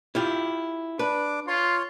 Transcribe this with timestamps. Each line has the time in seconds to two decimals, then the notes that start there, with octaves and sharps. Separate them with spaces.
0.15 E4 F4 G4
0.99 D4 B4 D6
1.48 F4 C#5 C6